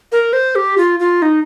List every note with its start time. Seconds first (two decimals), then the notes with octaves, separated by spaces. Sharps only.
0.12 A#4
0.33 C5
0.55 G4
0.78 F4
1.00 F4
1.22 D#4